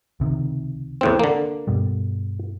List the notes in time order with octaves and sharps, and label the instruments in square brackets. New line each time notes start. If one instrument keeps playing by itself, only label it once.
[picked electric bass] C#2 C3 D#3
[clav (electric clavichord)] E2 A2 C4
D3 A#3
[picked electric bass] G2 B2 G3